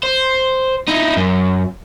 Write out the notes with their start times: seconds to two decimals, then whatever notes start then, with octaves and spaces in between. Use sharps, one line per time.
0.03 C5
0.88 D#4 E4
1.16 F#2